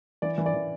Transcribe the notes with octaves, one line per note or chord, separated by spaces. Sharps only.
E3 D5
E3
D5
E3